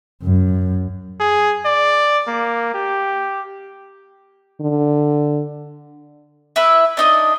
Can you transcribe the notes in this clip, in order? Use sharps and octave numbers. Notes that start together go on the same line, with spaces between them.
F#2
G#4
D5
A#3
G4
D3
E4 B4 E5
D4 D#4 D#5